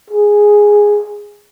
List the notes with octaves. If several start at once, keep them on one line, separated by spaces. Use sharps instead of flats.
G#4